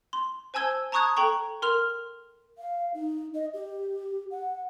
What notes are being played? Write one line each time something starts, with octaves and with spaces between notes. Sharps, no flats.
C6
C5 G#5 A5 E6 G#6 G7
A5 A#5 C#6 D#6 F#6 G#6
A4 G5 A#5 C#6
A#4 C6 F6 F7
F5
D#4
D#5
G4
F#5